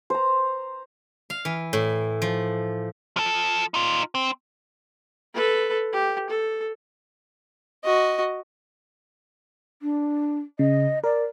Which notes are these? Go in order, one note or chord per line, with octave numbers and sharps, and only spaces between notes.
C5 A#5
F5
E3
A2
F3
F3 A4
D#4 F4
C4
A4 B4
G4
A4
F#4 D#5
D4
C#3 D#5
A#4 D5